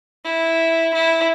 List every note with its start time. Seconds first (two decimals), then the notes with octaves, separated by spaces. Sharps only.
0.25 E4
0.94 E4